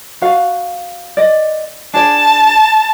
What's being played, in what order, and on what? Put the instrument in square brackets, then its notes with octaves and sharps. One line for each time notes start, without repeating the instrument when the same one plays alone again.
[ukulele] F#4 F5
D5 D#5
[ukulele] D4 G#4 D5 [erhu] A5